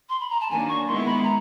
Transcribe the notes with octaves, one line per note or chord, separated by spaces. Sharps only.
C6
B5
A#5
A5
D#3 F#3 A#3 D4 G#5
C#6
D#3 G#3 B3 E4 C6
B5
A#5